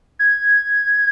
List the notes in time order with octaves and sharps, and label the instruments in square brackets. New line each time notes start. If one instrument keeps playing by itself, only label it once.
[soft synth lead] G#6